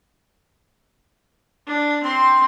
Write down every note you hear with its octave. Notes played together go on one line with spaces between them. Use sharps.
D4
C4 C6